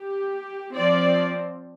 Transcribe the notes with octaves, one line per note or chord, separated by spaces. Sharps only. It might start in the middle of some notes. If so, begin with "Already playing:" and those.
Already playing: G4
F3 C4 D5